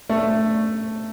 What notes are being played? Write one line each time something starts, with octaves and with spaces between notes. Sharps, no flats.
A3